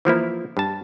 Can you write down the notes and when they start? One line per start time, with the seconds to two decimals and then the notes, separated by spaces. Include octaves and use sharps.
0.05 E3 F3 A#3 E4
0.57 G2 A5